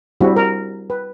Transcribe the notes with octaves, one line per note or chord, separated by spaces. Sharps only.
G3 C4 D4 E4 F#4
A#4
B4